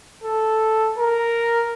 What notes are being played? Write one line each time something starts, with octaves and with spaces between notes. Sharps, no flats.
A4
A#4